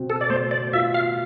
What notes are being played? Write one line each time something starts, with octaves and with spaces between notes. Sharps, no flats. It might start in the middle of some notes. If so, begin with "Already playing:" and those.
Already playing: B2 C4
A4
D5
A3 C5
D5
F4 E5
F5